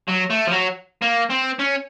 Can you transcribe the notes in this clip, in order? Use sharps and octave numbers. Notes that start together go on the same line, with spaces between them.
F#3
A3
F3
F#3
A#3
C4
C#4